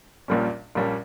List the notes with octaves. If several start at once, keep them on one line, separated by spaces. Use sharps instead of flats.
A#1 A#2 G3 A#3 C#4
A#1 A#2 G3 A#3 C#4